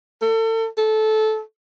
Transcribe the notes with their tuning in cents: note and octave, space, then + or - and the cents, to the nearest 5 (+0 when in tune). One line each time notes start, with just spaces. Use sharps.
A4 +35
A4 -15